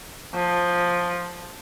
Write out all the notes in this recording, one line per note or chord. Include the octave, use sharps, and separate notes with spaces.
F3